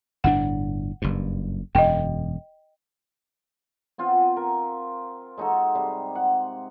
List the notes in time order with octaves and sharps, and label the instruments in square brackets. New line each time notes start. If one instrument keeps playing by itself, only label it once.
[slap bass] G1 A2 D4 [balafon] F#5
[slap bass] F#1 G2
[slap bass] E1 F#2 [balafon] D#5 G5
[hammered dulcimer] B3 C4 F4 F#5
A#4
G#3 D#4 F#4 A4
C3 G3 G#3
F#5